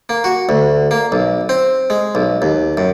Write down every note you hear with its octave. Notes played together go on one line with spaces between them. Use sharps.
A#3
F#4
D2
A#3
B1
C4
G#3
B1
D#2
F#2